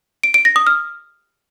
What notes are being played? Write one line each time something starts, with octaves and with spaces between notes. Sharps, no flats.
D7
D7
A#6
D#6
F6